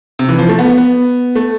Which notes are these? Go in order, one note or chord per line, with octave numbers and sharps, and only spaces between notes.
C3
E3
F3
A3
B3
B3
A3